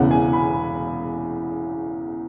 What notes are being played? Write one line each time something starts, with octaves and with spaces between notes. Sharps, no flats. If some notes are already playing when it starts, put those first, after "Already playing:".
Already playing: E1 E2 C#3 F#5
G#5
B5